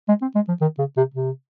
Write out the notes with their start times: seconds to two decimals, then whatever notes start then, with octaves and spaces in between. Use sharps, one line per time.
0.08 G#3
0.22 C4
0.35 G#3
0.48 F3
0.61 D#3
0.79 C#3
0.97 C3
1.14 C3